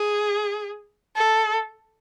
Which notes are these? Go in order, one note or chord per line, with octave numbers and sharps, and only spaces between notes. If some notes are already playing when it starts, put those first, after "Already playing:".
Already playing: G#4
A4